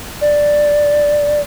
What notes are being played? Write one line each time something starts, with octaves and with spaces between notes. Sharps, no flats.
D5